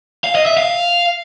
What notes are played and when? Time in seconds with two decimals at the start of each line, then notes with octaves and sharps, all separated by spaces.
0.24 F5
0.35 D#5
0.46 E5
0.57 F5